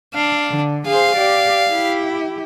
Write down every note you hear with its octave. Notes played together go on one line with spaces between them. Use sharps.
D4 F5
D3
G#4 C5 F5
G4 D5
E4 G4